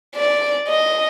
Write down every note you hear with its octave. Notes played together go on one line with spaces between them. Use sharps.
D5
D#5